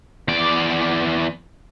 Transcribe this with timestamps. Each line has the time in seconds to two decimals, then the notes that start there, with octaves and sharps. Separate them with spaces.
0.28 E2 D5